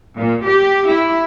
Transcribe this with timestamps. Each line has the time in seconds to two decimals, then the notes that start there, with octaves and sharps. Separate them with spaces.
0.16 A#2
0.47 G4
0.88 E4